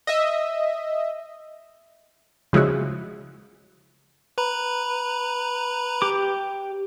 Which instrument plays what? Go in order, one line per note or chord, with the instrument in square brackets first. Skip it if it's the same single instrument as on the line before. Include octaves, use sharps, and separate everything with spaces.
[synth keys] D#5 E5
[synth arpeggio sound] C#3 F3 G#3 E4 F#4
[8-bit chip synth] B4 A#5 B5
[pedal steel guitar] G4 D6